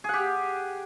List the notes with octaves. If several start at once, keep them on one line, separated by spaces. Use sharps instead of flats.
G4 G#4 F#5